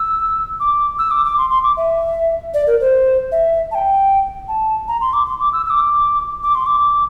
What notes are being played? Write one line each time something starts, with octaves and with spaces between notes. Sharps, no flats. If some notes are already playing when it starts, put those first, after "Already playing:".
Already playing: E6
D6
E6
D6
D6
C6
C6
D6
E5
D5
A#4
C5
E5
A5
G5
A5
A#5
C6
D6
C6
D6
E6
E6
D6
D6
C6
D6